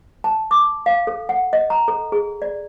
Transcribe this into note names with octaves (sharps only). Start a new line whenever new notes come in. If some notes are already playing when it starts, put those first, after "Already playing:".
A5
D6
F5
A4
F#5
D#5
A#5
A4
G#4
D5